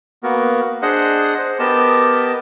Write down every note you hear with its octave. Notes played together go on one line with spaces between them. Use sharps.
A#3 B3 F#4 A#4
D4 G#4 C5 D#5 F#5
C5
B3 G4 A#4 D#5 A5